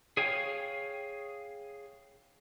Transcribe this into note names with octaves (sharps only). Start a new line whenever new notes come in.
G#4 C#5 F5 G5